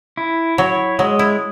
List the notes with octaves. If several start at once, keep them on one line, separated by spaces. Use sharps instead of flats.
E4
F#3 C#5
F#3 G#3
E4